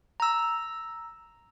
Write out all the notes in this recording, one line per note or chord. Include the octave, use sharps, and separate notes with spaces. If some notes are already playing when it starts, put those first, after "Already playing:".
A#5 E6